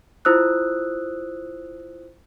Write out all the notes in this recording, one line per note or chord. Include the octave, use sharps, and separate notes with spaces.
E4 F4 C5 D#6 E6 F#6